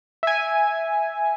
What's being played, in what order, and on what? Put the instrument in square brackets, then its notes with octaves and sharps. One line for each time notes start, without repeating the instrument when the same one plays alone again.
[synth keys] E5 G#5